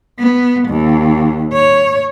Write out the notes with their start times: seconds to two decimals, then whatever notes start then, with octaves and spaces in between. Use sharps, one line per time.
0.19 B3
0.68 D#2
1.53 C#5